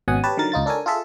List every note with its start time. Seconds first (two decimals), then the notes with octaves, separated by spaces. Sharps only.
0.08 G#1 B2 C#4 F#5 G#5 D#6
0.24 G4 B4 C#5 A5
0.37 D3 D#3 F#3 A#4 A6
0.52 C#2 D#4 F4 A6
0.66 D4 A4 A#4 C#5 G#5
0.86 F4 G#4 A4 E5